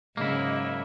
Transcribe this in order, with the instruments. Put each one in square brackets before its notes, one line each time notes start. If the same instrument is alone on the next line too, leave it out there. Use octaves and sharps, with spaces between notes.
[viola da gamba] G#2 C#3 F#3 [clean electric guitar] A#3 E4 [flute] D#5